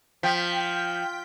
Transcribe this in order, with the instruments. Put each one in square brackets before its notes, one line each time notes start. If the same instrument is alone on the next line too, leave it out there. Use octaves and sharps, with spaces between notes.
[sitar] F3 [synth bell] G5 G6 B6